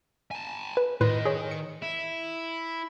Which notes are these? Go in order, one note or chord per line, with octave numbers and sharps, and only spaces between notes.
G#5 A5
B4
A2 D#3 B4 D#5 C6
G#4 C#5
C#7
E4